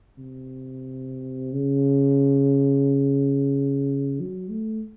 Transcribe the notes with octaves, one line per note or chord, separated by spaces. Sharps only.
C3
C#3
F#3
A3